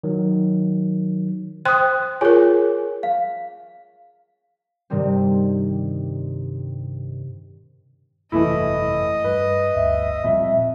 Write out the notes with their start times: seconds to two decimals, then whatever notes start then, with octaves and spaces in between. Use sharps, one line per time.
0.04 D#3 F#3
1.65 C5 G5 C6 D#6 F#6
2.21 F4 G#4 A#4 C#5 G#5
3.03 F5
4.90 G2 C3 D#3 G3 C4
8.32 G1 F2 C3 E3 A3 E4 D#5
9.24 G2 B4
9.75 G1 D2 G2 E5
10.24 F2 A#2 G3